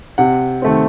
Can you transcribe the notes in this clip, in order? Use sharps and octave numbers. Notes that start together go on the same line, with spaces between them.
C3 F#5
D#3 A3 C4